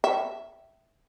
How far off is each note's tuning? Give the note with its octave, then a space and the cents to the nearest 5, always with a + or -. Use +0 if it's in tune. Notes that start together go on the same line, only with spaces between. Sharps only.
E5 +0 G5 -25